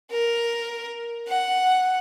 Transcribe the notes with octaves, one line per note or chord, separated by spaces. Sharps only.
A#4
F#5